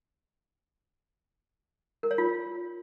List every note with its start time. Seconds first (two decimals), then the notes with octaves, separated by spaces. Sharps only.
2.03 A#4
2.11 C#5
2.18 F4